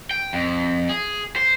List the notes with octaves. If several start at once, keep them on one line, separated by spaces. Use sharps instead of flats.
G5
F2
G#4
C5